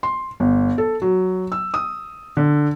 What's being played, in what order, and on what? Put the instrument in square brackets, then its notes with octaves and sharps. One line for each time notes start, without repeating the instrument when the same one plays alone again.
[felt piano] C6
G1
A4
F#3
E6
D#6
D3